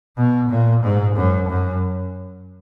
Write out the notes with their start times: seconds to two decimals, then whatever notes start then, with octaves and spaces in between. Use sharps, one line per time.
0.17 B2
0.50 A#2
0.83 G#2
1.16 F#2
1.49 F#2